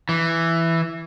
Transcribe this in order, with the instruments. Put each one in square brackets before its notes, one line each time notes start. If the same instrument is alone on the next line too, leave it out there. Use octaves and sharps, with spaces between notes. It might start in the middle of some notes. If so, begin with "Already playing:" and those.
[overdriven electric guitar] E3